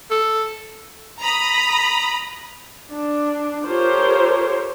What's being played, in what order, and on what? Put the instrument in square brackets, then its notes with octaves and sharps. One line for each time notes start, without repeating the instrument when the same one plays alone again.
[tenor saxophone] A4
[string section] A#5 B5 D#6
[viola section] D4
F4 G4 A4 A#4 C5 C#5